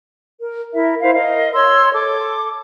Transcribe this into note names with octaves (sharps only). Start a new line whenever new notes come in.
A#4
E4 A#4 E5
E4 C5 E5 F5
A#4 D#5 F5
C#5 C6 E6
A4 D6